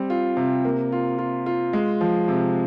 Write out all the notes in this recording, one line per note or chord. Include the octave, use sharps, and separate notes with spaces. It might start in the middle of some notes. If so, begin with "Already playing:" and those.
Already playing: G3 C4
F4
C3
A#3
F4
F4
F4
G#3
F3
C3